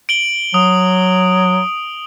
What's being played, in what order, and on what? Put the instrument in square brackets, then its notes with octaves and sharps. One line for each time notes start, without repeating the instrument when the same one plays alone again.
[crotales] D7 F#7 G7
[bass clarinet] F#3 [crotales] D#6